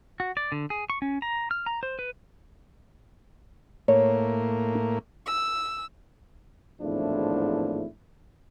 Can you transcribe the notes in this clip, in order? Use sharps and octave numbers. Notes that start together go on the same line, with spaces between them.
F#4
D5
D3
G#4
C#6
C#4
A#5
F6
A#5
C5
B4
A2 A#3 C#5
E6
G#1 E2 A2 F3 D4 E4